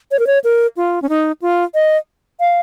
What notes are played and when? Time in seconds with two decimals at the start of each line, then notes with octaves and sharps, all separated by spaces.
0.11 C#5
0.19 A#4
0.27 C#5
0.44 A#4
0.77 F4
1.02 C#4
1.09 D#4
1.42 F4
1.74 D#5
2.40 F5